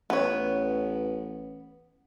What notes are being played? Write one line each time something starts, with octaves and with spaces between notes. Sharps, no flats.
A1 B3 C#5